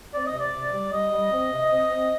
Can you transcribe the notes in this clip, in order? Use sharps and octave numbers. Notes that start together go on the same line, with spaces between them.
C4 D5
D#5
C3
D5
C3
G3
G3 D#5
G3
C4
C3
C4
C4